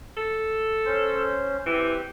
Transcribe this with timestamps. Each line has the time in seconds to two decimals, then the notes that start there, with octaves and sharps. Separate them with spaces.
0.17 A4
0.86 C#4 C5
1.66 E3 C4 G4